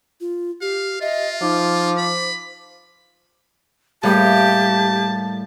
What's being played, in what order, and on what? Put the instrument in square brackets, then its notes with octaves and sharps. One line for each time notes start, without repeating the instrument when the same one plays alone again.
[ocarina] F4
[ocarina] G4 [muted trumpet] F5
[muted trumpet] F4 [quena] D#5 [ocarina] E5
[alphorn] F3 [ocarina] D#4 [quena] D6
[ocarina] C5 [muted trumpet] B5
[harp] A2 G3 G#4 [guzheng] A#3 [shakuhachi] G4 [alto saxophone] A5